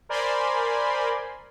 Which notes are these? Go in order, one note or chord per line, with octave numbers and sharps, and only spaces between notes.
A#4 C5 D5 G#5 B5 C6